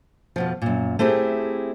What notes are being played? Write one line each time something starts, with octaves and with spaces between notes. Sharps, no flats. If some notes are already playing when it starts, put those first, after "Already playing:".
F2 B2 F3
F#2 A#2
A3 C4 E4 G4 G#4